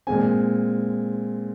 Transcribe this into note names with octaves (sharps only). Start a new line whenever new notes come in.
A#2 G#3 C4 G#5